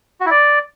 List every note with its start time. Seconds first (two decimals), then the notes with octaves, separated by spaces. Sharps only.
0.21 F#4
0.26 E4
0.31 D5